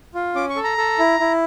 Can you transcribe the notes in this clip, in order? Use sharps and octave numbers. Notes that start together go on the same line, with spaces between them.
F4
C#4 D6
C#6
A4
A#5
A4
E4
E4